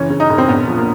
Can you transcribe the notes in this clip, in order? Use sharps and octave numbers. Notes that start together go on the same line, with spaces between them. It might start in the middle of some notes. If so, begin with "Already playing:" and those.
Already playing: F#1 E3 C#4
C#3
D#4
E1
C4
A#1 B3
F3
A#3